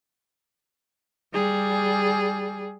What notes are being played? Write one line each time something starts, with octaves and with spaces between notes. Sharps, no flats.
G3 G#4